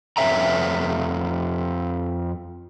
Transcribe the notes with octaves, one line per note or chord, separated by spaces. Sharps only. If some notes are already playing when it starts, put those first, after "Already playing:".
F2 B4 C#5 E5 G5 A#5